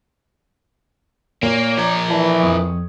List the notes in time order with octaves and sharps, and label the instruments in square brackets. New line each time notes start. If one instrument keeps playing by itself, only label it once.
[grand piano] A#2 [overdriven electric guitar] A#3 [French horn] C#5
[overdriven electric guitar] F3 A#4 [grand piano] D5 D6 G#6
[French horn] E3 [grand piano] D5 A5
[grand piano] F2 C#6 D#6